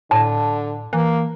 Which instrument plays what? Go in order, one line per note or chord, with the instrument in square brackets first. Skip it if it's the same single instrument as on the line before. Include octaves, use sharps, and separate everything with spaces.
[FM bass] A2 [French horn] D3 [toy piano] A5
[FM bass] E3 [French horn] A#3